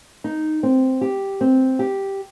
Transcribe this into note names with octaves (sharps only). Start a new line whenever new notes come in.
D#4
C4
G4
C4
G4